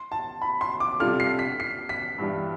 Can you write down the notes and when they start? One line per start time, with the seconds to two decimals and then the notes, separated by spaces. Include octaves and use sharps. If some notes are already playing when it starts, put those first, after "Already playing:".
Already playing: C6
0.12 A5
0.42 B5
0.61 C6
0.80 D6
1.00 C3 G3 D4 F4 A4 F6
1.20 C7
1.39 B6
1.60 C7
1.89 B6
2.18 G2 E3 G3 D4